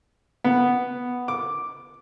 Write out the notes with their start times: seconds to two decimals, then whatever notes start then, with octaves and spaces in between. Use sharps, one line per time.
0.44 B3
1.28 D6